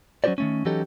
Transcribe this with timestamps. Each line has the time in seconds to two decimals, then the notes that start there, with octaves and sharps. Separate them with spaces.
0.24 F#3 C#4 F#4 G4 C5 D5
0.38 D#3 A3 C#4
0.65 E3 F#3 C#4 D#4 G4 A4